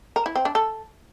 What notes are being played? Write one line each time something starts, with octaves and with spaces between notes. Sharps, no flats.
A#4
E4
C4
D4
A4